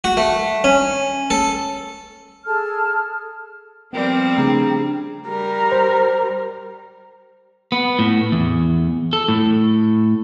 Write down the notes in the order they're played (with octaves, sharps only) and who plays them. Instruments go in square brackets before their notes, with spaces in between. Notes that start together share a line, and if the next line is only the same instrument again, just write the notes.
[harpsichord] F#4
A3
C#4
A4
[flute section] G#4 A4 A5 F6
[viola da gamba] F3 G3 C4 [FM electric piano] B3 A#4 D5 [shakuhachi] G5
[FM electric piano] C#3 A3 [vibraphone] D4 G#4 A#5
[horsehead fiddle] G3 A#4
[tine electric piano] C5
[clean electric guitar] B3
A2
E2
A4
A2